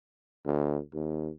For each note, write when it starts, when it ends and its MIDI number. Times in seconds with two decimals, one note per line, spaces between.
0.45 0.79 38
0.94 1.30 39